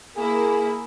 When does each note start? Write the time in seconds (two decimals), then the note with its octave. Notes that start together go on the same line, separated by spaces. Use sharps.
0.17 A#3 E4 G#4